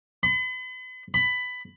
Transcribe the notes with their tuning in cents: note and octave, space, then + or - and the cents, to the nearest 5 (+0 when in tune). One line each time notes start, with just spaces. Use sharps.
B5 +40
B5 +15